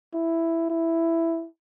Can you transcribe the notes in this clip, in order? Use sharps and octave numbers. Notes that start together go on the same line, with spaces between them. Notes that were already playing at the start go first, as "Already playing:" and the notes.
E4
E4